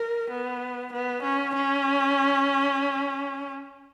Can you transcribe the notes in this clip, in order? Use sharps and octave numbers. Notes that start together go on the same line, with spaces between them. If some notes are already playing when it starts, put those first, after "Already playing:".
Already playing: A#4
B3
B3
C#4
C#4